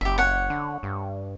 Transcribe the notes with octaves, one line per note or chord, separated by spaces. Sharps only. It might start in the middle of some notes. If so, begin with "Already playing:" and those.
F#1 G4 E5
C#5 F#5
D3
G2